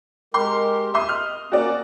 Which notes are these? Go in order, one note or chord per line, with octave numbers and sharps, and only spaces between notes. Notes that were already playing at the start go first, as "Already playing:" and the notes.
G#3 G4 A#4 C6
D#2 E5 G#5 C6 D#6
D#5 F6
A#3 C#4 F#4 D5